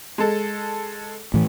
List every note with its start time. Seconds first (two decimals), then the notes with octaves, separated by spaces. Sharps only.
0.18 G#3 A4
1.34 A2 E3